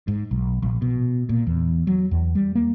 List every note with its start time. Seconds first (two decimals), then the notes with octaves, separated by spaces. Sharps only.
0.08 G#2
0.31 B1
0.63 A#1
0.82 B2
1.29 A#2
1.47 E2
1.87 F#3
2.11 E2
2.35 G3
2.55 A#3